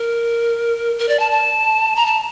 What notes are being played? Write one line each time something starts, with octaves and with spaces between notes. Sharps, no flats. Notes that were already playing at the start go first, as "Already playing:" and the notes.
Already playing: A#4
A#4
D5
A5
A5
A#5
A5